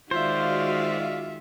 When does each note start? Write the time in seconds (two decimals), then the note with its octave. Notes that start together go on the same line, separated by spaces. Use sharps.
0.11 D#3 G#3 F4 F#4 C5 D5 E5 F5